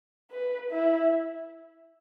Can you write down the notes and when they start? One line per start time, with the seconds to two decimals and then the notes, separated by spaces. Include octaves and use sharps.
0.32 B4
0.71 E4